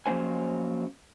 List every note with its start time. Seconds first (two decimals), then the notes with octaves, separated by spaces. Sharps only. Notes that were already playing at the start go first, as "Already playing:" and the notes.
0.06 F3 F#3 A#3 C#4 C5 G#5